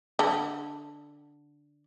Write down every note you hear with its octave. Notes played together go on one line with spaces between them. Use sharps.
D3 A4